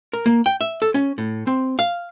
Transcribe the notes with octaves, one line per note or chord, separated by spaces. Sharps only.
A#4
A#3
G5
E5
A4
C#4
A2
C4
F5